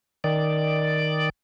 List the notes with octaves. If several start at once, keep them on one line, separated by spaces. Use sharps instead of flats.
D#3 D5